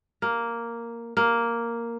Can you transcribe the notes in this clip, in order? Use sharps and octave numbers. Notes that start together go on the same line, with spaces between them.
A#3
A#3